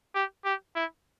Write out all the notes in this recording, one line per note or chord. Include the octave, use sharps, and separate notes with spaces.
G4
G4
E4